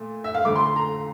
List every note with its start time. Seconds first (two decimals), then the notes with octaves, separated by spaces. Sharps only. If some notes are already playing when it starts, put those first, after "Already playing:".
Already playing: A#2 A3
0.24 E5
0.35 F5
0.44 F2 D3 A3 D6
0.56 C6
0.66 C6
0.76 A#5